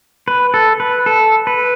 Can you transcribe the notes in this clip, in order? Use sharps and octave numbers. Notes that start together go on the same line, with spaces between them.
B4
A4
B4
A4
B4